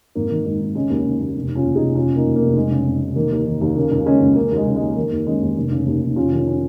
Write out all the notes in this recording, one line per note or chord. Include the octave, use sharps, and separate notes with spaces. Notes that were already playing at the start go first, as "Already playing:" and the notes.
G#1 A#3
D#3
G#2
G#1
C#3 G#3 C#4
D#2
C#3
D#2
F1
C#3
C#4 F4
D#2
F1 D#4 G#4
F1 C#4 F4
C#3
A#3 D#4
D#2
A#3
F1
F1 G#3
C#3
F2
F1
D#3 A#3
D#2
D#3
D#2
C#3 A#3
C#2
C#3 G#3 C#4
C#2
C#3 A#3
D#2
G#3
C#3
G#3
D#2
D#3 A#3
D#2
D#3 G#3 C#4
D#2
F1
C#3
D#2
F1
F1 C#4 F4
D#3 C#4 F4
C#4